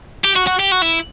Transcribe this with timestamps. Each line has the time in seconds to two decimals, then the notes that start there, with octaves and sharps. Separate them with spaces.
0.24 G4
0.36 F#4
0.47 F#4
0.59 G4
0.72 F#4
0.82 E4